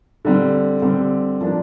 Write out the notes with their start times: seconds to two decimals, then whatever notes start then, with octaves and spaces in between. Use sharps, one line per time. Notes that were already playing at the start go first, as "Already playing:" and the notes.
0.25 D3 G3 C4
0.82 D3 G3 C4
1.41 F3 A#3 D4